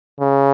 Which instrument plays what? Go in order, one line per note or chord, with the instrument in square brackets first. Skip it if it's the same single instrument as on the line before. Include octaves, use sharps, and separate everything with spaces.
[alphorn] C#3